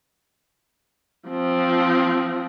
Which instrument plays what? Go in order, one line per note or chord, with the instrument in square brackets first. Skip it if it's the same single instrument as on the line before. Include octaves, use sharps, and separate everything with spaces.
[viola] F3 C4